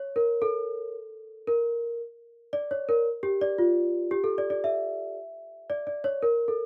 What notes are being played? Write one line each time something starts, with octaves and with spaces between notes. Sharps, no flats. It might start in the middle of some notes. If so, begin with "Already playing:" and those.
Already playing: C#5
A#4
A4
A#4
D5
C#5
A#4
G4
D5
F4
G4
A4
D5
D5
E5
D5
D5
C#5
A#4
A4